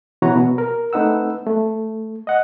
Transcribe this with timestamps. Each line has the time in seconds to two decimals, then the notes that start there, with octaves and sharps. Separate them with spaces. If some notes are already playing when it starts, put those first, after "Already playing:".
0.22 B2 E3 F#4 B4 C#5 A#5
0.36 B2
0.58 A#4
0.93 A3 C4 D#4 B4 F#5 E6
1.47 A3
2.27 D#5 F#5